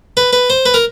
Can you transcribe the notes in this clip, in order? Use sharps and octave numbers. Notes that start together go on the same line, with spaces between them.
B4
B4
C5
B4
A#4